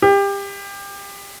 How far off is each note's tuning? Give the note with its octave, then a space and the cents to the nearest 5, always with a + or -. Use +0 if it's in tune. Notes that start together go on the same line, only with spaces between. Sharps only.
G4 +25